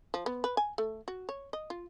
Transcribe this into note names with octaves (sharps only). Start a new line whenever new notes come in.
F3
B3
B4
G#5
A3
F#4
C#5
D#5
F4